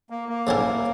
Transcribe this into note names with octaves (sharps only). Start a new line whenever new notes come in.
A#3
A#3
G#2 F#3 C#4 E4 A#4